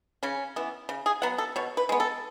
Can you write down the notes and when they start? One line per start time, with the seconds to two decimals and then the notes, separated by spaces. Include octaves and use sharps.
0.23 C#3 C#4
0.56 E3 B3
0.89 C#3
1.06 G#4
1.22 F#3 B3 F#5
1.38 A4
1.56 B2 C#5
1.77 B4
1.89 G#3 B3
2.00 A4